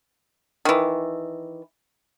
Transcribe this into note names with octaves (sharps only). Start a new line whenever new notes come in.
D#3 E3